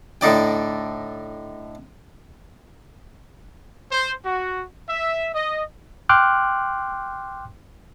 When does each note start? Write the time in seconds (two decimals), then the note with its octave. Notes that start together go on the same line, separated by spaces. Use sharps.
0.21 A2 D3 D#4 D5 G5
3.91 C5
4.25 F#4
4.89 E5
5.35 D#5
6.09 G5 C6 D6 F6 F#6